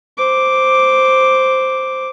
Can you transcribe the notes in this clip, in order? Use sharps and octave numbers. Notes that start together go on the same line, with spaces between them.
C5 D6